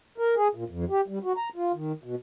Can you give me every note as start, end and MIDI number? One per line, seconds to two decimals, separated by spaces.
0.18 0.35 70
0.37 0.48 68
0.55 0.64 46
0.70 0.85 41
0.90 1.01 67
1.08 1.19 55
1.24 1.33 66
1.37 1.49 82
1.56 1.72 65
1.74 1.92 51
2.04 2.15 47